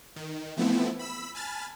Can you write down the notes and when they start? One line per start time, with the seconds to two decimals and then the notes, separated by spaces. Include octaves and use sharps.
0.16 D#3
0.57 E3 F3 A3 B3 C4 E4
0.99 B5 E6 B6
1.35 G#5 A5 B5 F6 A6